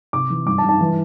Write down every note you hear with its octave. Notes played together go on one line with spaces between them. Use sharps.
C3 D6
E3
G2 D6
A5
G2
A5
E3